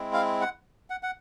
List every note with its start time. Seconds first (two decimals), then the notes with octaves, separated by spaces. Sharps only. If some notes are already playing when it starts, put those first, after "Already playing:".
Already playing: G#3 C4 E4
0.13 F5
0.41 F#5
0.90 F#5
1.03 F#5